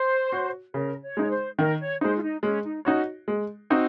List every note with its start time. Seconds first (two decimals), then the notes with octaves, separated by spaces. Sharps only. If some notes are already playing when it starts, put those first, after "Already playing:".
Already playing: C5
0.32 F#4 C#5
0.74 C#3 A#4
1.03 C#5
1.17 G#3 D#4 C#5
1.30 C5
1.58 D#3 A#4
1.80 C#5
2.01 G#3 D#4 C5
2.17 F4
2.22 D#4
2.43 G#3 C#4
2.64 D#4
2.85 C#4 D#4 F#4 C#5
3.28 G#3
3.70 C4 D#4 F#4